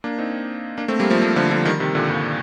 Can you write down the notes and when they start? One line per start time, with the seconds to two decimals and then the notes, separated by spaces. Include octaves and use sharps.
0.04 A#3 D4
0.18 C4 D#4
0.78 A#3 D4
0.88 A3 C4
0.99 G3 A#3
1.10 F3 A3
1.22 F3 A3
1.36 D3 F3
1.51 D3 F3
1.65 D#3 G3
1.80 C3 D#3
1.95 A#2 D3
2.10 G2 A#2